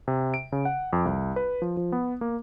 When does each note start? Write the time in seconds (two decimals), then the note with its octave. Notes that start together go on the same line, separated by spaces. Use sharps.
0.08 C3
0.34 D7
0.52 C#3
0.65 F#5
0.93 F2
1.05 C2
1.36 B4
1.62 F3
1.77 F3
1.92 B3
2.21 A#3